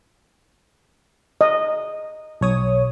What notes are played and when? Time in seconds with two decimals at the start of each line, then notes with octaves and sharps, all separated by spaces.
1.41 D#5
2.41 B1 C#5 D#6